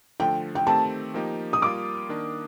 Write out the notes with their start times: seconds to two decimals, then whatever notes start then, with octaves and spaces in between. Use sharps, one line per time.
0.20 D3 F3 A3 G5
0.55 G5
0.67 D#3 A3 C4 G4 A5
1.14 F3 A#3 D#4 G4
1.53 D#6
1.62 G3 A#3 F4 D6
2.09 D#3 A#3 D4